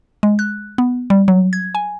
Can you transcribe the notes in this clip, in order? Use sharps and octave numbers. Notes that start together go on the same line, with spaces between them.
G#3
F#6
B3
G3
F#3
G#6
G#5